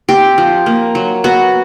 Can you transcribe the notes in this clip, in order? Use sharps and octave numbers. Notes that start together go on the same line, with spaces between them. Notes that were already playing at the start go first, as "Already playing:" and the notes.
C4 G4
F3
A#3
F#3
B3 F#4